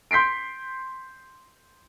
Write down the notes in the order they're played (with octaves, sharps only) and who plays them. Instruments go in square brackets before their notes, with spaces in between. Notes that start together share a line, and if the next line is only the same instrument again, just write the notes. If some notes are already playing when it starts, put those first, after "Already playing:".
[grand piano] C6 G6 B6 C7 D7